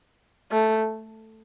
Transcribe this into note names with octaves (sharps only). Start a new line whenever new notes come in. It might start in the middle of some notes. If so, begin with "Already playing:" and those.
A3